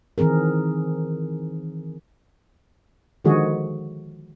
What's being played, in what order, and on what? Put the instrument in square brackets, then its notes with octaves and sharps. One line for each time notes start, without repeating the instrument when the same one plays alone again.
[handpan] D#3 E3 C4 G#4 A#4
[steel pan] D3 D#3 F3 G#3 F#4 G#4